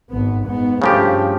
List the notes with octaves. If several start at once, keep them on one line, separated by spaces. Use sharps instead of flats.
G#1 B3
G#2 B3
G2 C#3 F3 A3 G4